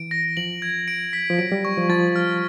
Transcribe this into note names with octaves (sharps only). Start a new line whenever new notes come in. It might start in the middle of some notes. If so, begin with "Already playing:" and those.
Already playing: E3 D7
A#6
F3 F#7
G#6
D7
B6
F3
F#3 D7
G3
C#6
F3
F3 A6
F6